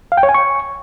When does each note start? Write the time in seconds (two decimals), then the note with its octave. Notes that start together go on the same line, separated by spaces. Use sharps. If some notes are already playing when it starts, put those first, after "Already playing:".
0.12 F5
0.17 G5
0.23 C#5
0.29 G#5
0.34 C#6